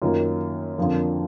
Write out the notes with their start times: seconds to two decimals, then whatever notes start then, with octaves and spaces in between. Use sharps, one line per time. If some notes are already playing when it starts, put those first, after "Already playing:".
0.02 F#2 D#3 A#3 F4
0.78 F2 D3 F3 A#3